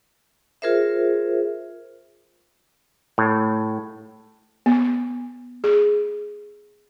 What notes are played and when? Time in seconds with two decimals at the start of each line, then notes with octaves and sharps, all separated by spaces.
0.62 F4 G#4 A#4 C5 E5
3.18 A2
4.66 B3
5.64 G#4